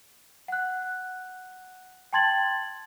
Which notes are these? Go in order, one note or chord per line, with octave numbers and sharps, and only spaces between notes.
F#5 F#6
G5 A5 C6 G#6 A6 F#7